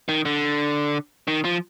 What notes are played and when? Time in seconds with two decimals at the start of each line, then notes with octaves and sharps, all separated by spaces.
0.09 D#3
0.25 D3
1.28 D#3
1.44 F3